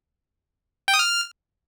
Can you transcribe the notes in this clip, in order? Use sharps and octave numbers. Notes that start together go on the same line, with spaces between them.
G5
D#6
F6